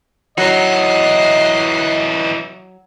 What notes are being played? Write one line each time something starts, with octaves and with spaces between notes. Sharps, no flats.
E3 F#3 D#4 D#5 F#6 C7